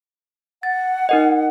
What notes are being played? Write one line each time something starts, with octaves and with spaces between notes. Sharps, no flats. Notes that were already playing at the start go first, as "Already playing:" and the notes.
F#5 A6
D#4 A#4 D#5